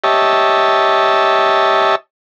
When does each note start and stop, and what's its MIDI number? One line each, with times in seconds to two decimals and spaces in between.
0.04 1.95 67
0.04 1.95 73
0.04 1.95 75
0.04 1.95 76
0.04 1.95 81